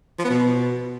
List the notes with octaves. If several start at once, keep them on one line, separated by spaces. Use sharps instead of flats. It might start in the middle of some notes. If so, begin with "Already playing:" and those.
F3
B3
B2